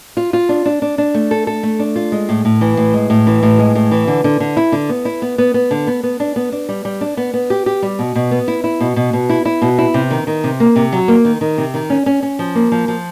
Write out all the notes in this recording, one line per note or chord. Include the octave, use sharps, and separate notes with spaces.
F4
F4
D4
D4
D4
D4
A3
A4
A4
A3
D4
F4
G#3
A2
A2
E3
A2
G#3
A2
E3
A2
G#3
A2
E3
D3
D3
D3
E4
D3
B3
E4
B3
B3
B3
D3
B3
B3
D4
B3
D4
G3
G3
D4
B3
B3
G4
G4
G3
B2
B2
B3
E4
E4
B2
B2
B2
E4
E4
B2
E4
C3
D#3
D#3
C3
A#3
C3
F#3
A#3
D#3
D#3
C3
D#3
C#4
C#4
C#4
F3
A#3
F3
F3